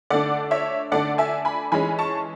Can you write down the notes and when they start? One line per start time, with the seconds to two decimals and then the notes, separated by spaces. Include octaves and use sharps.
0.10 D3 A3 D4 D5 F#5
0.51 C#5 E5
0.92 D3 A3 D4 D5 F#5
1.18 E5 G#5
1.45 G#5 B5
1.72 E3 G#3 C#4 G#5 B5
1.99 A5 C#6